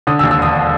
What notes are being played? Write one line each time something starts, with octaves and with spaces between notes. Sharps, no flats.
D3 D#6
E6
D#2
E6
E1 D#6